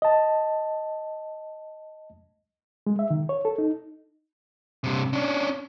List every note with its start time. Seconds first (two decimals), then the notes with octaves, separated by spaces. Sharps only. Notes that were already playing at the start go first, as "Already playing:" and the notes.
0.02 D#5 A5
2.87 G#3
2.99 E5
3.10 D#3
3.29 C#5
3.45 A4
3.58 D#4
4.84 G2 C3
5.13 C#4 D4